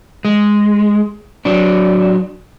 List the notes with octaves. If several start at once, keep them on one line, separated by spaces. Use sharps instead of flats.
G#3
F#3 D4